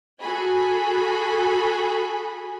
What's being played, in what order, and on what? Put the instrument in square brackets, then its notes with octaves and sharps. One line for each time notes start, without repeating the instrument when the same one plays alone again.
[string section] F#4 G#4 A4 G#5 B5